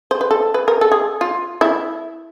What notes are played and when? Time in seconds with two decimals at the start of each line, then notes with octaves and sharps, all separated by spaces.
0.11 C5
0.21 B4
0.31 A4
0.54 B4
0.68 A#4
0.81 A4
0.92 G#4
1.21 F4
1.61 E4